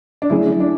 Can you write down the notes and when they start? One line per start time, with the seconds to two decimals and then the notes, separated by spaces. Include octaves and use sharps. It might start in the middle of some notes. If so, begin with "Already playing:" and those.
0.22 D4
0.30 D3 F#3 A3 C#4 E4 G#4
0.60 D4